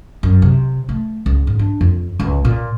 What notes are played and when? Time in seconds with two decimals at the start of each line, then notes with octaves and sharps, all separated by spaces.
0.23 F#2
0.42 C3
0.89 A3
1.26 C#2
1.47 G#2
1.59 D4
1.81 F2
2.19 C#2
2.45 A#2